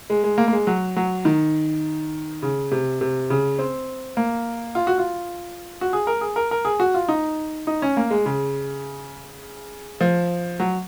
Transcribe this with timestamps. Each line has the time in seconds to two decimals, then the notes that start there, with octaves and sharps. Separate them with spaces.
0.10 G#3
0.24 G#3
0.38 A#3
0.48 A#3
0.53 G#3
0.67 F#3
0.96 F#3
1.25 D#3
2.43 C#3
2.71 C3
3.01 C3
3.30 C#3
3.59 C4
4.17 A#3
4.75 F4
4.87 F#4
4.98 F4
5.81 F#4
5.93 G#4
6.07 A#4
6.21 G#4
6.36 A#4
6.51 A#4
6.65 G#4
6.80 F#4
6.94 F4
7.08 D#4
7.67 D#4
7.82 C#4
7.97 A#3
8.11 G#3
8.26 C#3
10.01 F3
10.60 F#3